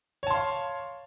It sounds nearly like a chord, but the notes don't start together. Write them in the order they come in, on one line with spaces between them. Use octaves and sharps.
C#5 A5 C6 F5